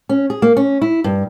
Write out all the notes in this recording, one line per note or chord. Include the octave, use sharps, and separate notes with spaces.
C#4
G#4
A#3
C#4
E4
G2